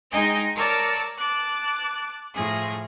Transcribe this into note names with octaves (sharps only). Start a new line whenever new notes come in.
G#3 D#4 D#5 G5 G#5
A#4 C#5 D5 A5 E6
A5 D6 F#6
A2 F3 G#4